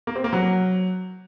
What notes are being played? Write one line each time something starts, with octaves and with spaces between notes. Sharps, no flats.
A#3
C4
A#3
F#3